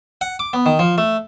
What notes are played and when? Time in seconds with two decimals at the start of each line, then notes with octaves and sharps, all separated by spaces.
0.21 F#5
0.39 D6
0.53 B3
0.66 D#3
0.79 F3
0.98 A3